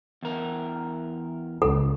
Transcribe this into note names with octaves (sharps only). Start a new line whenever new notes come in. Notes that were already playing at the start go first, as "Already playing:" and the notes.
E2 A#4
C#2 A4